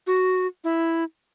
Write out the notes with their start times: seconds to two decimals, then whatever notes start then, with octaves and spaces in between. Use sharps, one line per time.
0.07 F#4
0.64 E4